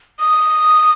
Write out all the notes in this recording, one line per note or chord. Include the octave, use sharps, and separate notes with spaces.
D#6